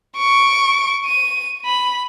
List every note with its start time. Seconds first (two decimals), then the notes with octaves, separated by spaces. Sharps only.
0.17 C#6 D7
1.06 D#7
1.65 B5